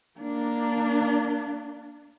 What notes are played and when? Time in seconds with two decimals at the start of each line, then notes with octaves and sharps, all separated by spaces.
0.19 A#3 D4